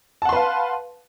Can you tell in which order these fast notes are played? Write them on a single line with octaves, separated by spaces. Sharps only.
A5 F#5 C6 B4 F5